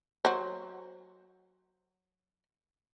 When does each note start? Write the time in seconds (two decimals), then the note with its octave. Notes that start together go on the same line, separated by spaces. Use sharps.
0.25 F#3 C5